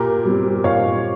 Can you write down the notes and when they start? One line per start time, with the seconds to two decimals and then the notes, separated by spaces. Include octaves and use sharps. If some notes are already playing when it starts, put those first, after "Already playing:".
Already playing: A#2 G4 A#4
0.25 G3 C4
0.64 A#2 C#5 F5